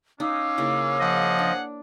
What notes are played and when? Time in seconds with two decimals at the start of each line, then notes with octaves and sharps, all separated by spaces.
0.20 C#4 D#4 F5 D6 E6
0.58 C#3 A#3 E4
1.00 F3 G#4 D#5 F#5
1.39 D4